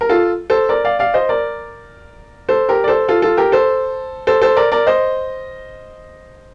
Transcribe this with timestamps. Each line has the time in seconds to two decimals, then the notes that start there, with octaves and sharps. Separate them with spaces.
0.01 A#4
0.09 F4 A4
0.50 A4 C5
0.69 A#4 D5
0.85 D5 F5
0.99 D5 F5
1.14 C5 D#5
1.29 A#4 D5
2.49 A4 C5
2.69 G4 A#4
2.84 D5
2.88 A4 C5
3.08 F4 A4
3.22 F4 A4
3.37 G4 A#4
3.52 A4 C5
4.27 A4 C5
4.42 A4 C5
4.56 A#4 D5
4.72 A#4 D5
4.87 C5 D#5